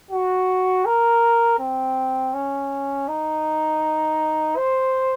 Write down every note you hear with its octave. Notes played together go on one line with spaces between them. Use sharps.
F#4
A#4
C4
C#4
D#4
C5